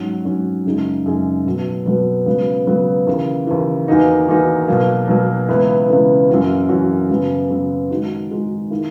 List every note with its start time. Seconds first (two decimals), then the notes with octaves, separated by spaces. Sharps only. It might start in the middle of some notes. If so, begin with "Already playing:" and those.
Already playing: G#2 F#3 C#4 F#4
0.25 G#2 F#3 C#4 F#4
0.66 F#2 C#3 G#3 D#4 G#4
1.06 F#2 C#3 G#3 D#4 G#4
1.45 B2 F#3 B3
1.86 B2 F#3 B3
2.26 C#2 C#3 F#3 B3
2.67 C#2 C#3 F#3 B3
3.07 D#2 C#3 E3
3.47 D#2 C#3 E3
3.88 E2 D#3 A#3 D#4 F#4
4.28 E2 D#3 A#3 D#4 F#4
4.68 B2 F#3 A#3
5.08 B2 F#3 A#3
5.49 C#2 C#3 E3 B3 E4
5.88 C#2 C#3 E3 B3 E4
6.30 F#2 E3 A#3 C#4 F#4
6.69 F#2 E3 A#3 C#4 F#4
7.09 F#2 C#3 F#3 B3
7.50 F#2 C#3 F#3 B3
7.91 D#3 G#3 D#4 F#4
8.31 D#3 G#3 D#4 F#4
8.70 D#3 A#3 E4